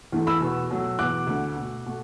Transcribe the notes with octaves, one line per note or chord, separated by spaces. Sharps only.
E2 E3 A3
B5 E6
E2 B2 B3
B2 F#3 A3
E2 B2 B3 D6 F#6
D2 D3 A3
B2 A3
B2 A3